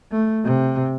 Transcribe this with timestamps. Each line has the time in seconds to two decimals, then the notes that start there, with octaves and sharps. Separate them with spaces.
0.12 A3
0.44 C3